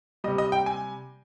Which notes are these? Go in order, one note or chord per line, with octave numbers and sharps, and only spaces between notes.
C3 G3 D#5
D#5
G5
G#5